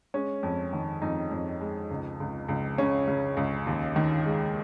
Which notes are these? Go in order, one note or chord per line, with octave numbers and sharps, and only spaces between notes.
G#3 C#4
F2
D#3
F2 D#4
F2
G#3
C#2
C#2
C#2
C#3 C#4
C#3
C#2
D#2
D#3
G#3